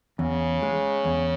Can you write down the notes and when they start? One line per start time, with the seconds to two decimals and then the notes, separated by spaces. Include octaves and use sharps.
0.19 E2 C#3
0.63 G#3
1.05 E2